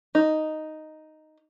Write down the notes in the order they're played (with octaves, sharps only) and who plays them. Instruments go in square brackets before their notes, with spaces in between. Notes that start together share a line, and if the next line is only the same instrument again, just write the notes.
[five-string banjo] D#4